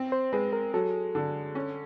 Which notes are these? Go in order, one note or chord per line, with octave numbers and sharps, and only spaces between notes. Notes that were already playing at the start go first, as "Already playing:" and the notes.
Already playing: C4
C5
G#3 B4
A#4
F#3 A4
D3
C#4